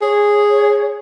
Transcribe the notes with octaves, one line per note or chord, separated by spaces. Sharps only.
G#4 C#5